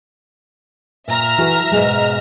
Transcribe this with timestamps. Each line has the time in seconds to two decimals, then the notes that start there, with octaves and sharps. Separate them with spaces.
1.08 A#2 E5 A#5 F6
1.38 E3 F#4 A4
1.71 G#2 B2 G#3